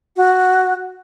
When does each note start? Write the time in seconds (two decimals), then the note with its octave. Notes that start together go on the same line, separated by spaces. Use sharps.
0.17 F#4